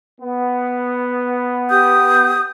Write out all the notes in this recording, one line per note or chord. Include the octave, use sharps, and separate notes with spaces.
B3
G4 D#6 G6